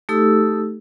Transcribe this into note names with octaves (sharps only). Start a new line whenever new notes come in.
A3 D#4 G4 A4 E6